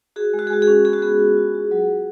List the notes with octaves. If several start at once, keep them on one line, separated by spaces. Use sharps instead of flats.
F#4 G#4
G#3
F#4
G#4
G#3 F#4
G#4
C#4
B3 G#4
F#4
B3 G#4
F4
F4
F#4
F#3
F#3